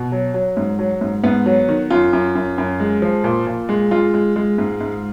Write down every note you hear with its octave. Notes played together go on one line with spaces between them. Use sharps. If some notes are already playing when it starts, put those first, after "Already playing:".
Already playing: B2
F#3
F#3
G#2
F#3
G#2
G#2 B3
F#3
D#3
F#2 F4
F#2
F#2
F#2
G#3
F3
A#2
A#2
G#3
G#3 F4
G#3
G#3
G#2
G#2